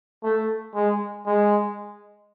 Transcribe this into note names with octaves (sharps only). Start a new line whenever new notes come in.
A3
G#3
G#3